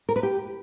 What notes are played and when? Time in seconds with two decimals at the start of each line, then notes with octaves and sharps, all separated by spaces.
0.09 A#4
0.16 B4
0.23 G4